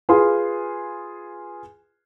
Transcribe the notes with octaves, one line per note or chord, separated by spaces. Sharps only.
F4 G#4 B4 F5 C6